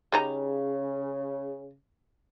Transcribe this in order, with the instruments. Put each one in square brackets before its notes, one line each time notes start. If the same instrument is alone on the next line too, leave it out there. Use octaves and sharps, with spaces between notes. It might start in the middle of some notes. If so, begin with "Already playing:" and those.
[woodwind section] C#3 [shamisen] G3 D#4 A#5